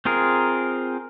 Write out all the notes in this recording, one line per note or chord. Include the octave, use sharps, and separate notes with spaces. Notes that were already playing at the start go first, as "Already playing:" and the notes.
C4 F4 G#4 A#4